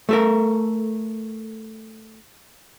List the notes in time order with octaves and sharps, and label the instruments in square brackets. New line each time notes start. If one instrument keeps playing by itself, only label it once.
[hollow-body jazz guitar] A3 A4 A#4